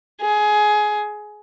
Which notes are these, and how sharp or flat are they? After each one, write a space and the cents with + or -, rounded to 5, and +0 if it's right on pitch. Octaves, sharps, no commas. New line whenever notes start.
G#4 +20